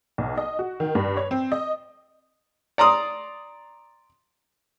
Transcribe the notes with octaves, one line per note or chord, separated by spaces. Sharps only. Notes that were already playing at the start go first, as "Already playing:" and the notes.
B1
D#5
F#4
D#3
G2
C#5
C4
D#5
D5 A#5 C6 D#6